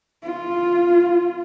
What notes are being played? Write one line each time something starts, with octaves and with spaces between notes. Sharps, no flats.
F4